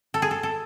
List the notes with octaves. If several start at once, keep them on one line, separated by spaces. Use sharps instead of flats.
A4
G#4
A4
A4